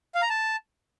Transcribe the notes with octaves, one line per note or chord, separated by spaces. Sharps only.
F5
A#5
A5